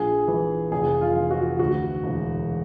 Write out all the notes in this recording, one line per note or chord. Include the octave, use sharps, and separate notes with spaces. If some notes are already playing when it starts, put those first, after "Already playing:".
Already playing: A#1 G#4
E3
F1 G#4
F4
E3
F#4
D2 F#4
E1